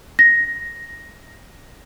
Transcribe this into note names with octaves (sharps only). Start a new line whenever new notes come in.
A#6